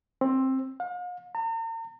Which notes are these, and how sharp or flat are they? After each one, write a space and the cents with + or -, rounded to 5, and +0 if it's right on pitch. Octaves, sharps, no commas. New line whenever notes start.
C4 +15
F5 +45
A#5 -45